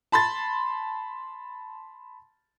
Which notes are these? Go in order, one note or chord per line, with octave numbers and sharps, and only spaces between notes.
A5 B5 C6 A6